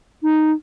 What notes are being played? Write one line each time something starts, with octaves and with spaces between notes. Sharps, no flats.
D#4